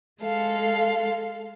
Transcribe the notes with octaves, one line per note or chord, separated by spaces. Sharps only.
G#3 A4 F5